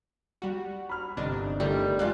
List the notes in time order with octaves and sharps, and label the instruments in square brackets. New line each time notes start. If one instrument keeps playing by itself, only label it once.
[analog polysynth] G3 F#4 [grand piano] F#5
[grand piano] B5 F6
[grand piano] G1 [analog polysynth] C3 D4 D#4
[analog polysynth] D3 D#3 A3 [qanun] G3
[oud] G#3 F4 D5 [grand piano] F#6